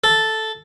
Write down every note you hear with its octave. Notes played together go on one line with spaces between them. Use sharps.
A4